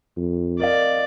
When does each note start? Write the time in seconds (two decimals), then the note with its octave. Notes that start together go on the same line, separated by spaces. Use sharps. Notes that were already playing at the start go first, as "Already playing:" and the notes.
0.17 F2
0.60 A#4 D5 D#5 F5